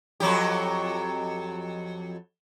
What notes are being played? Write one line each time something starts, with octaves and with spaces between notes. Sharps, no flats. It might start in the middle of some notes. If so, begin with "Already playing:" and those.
F2 F#3 G4